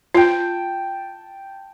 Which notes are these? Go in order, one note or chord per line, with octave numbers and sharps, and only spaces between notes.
F4 G5 A5